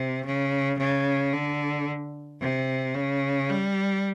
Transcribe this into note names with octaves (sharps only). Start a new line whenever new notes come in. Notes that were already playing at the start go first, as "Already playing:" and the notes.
Already playing: C3
C#3
C#3
D3
C3
C#3
G3